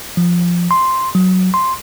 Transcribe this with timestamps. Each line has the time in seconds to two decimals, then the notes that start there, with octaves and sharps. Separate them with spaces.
0.17 F3
0.71 C6
1.15 F#3
1.54 C6